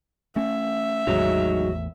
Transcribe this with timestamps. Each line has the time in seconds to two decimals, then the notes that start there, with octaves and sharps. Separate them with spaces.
0.36 A3 C#4 E5
1.07 A1 E2 A2 D#3 F#3 G#3 D#4